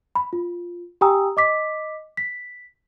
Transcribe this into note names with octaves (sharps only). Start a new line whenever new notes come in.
B5
F4
G4 G5 G#5 A#5 D#6 E6
D#5 D6 B6
B6